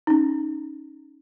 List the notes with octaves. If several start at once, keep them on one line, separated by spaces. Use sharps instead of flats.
C#4 D#4